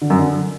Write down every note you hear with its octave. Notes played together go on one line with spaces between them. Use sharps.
D3
F#2
D3